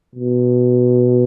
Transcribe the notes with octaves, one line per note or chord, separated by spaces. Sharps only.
B2